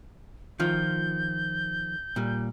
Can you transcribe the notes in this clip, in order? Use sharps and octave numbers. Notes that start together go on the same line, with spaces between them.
D#3 F3 F4 G6
A#2 G3